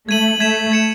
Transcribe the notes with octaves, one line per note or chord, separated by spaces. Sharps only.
A3 G#6 D#7 F#7
A3 G#6 B6 E7
G#6 C#7 E7